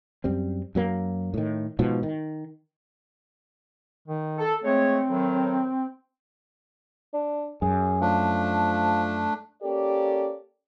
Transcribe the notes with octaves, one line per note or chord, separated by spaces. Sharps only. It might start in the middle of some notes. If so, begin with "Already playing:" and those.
F#2 G3 C4
F#2 F#3 A#3
A2 D#3
G#2 B2 F3
D#3
D#3
A4
G#3 A3 C4 C#5
A2 D#3 F#3
D4
F#2 G#4
F3 A3 D4
A#3 C#4 G4 A4 D5